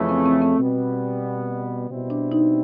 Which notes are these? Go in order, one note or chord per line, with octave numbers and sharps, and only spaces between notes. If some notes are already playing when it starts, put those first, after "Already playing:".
Already playing: F2 C#3 E3 A3
C4
C4
C4
B2 G3 B3
B2 G3 C4 E4
D4
D#4